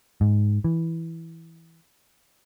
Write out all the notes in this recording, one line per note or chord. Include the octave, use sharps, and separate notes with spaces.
G#2
E3